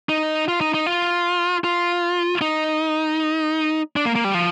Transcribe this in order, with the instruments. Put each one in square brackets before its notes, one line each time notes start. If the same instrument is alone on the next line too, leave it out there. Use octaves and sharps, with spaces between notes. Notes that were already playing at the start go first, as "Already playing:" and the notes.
[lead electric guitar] D#4
F4
D#4
D#4
F4
F4
D#4
D4
A#3
A#3
G3
F3